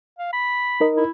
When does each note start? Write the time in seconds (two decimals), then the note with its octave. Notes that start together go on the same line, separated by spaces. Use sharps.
0.19 F5
0.33 B5
0.80 D#4 A#4 D#5
0.97 E4